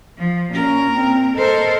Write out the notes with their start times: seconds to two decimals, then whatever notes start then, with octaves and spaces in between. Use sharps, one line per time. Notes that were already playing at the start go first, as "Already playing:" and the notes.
0.18 F3
0.51 A#2 C#4 A#4
0.92 C4
1.36 A4 A#4 C5 D#5